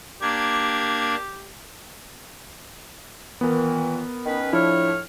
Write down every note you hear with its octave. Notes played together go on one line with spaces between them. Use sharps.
A#3 D4 G4 G#6
A#2 D#3 E3 B3 A#4
D#3 C#4 B4
A2 F3 D4 E4 C#5 F6